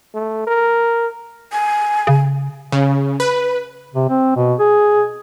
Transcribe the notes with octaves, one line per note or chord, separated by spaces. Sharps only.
A3
A#4
G#5
C#3
C#3
B4
C3
C4
B2
G#4